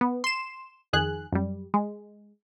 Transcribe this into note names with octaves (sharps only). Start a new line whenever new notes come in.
B3
C6 E7
F2 D#3 G#4 F#6
F#2 G3
G#3